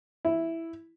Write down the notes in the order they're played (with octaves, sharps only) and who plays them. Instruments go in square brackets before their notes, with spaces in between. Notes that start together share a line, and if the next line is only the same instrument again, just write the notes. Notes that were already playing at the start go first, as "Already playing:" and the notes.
[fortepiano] E4